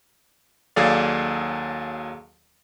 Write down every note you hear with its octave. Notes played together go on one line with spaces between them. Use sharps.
D#2 F#3 G#4 A4 D5 F5